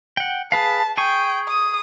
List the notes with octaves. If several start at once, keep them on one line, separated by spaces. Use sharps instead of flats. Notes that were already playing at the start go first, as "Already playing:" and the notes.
F#5 G5
G#4 B4 F5 A5
G#4 G5 G#5 C#6
D#6